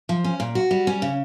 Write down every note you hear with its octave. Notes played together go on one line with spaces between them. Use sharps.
F3
C#4
A#2
F#4
G3
C#4
C#3